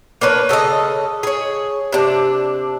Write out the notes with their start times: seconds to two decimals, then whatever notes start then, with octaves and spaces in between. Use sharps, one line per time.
0.21 A#3 D4 B4 C#5
0.49 C#3 A4 B4 D#5
1.23 G#4 C#5
1.92 C3 D4